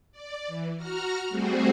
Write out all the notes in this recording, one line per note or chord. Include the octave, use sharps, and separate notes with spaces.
D5
E3
F#4 A#5 F6
G3 A3 C4 F#4 G#4 C5